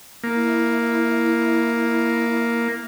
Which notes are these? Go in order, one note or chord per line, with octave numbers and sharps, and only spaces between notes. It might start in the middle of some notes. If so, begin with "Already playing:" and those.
A#3 E4